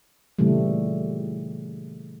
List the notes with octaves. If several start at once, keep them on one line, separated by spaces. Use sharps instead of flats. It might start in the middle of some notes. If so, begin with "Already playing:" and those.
A#2 C#3 E3 G3 A3